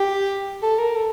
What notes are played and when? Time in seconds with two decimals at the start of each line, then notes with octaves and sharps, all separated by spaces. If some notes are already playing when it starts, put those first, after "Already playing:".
Already playing: G4
0.63 A4
0.79 A#4
0.96 A4